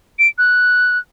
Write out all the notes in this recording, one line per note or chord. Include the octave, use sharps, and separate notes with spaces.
D7
F#6